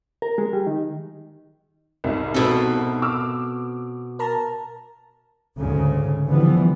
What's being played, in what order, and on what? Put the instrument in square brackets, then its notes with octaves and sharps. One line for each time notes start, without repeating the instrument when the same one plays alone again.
[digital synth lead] A#4
G#3
G3
D#3
[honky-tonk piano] C2 G#2 E5
[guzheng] B2 A4 [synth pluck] C4 F#4 B4
[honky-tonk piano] D6 E6 F6
[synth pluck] A#4 A5 A#5
[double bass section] D2 G#2 C#3
D3 E3 F3 G3 B3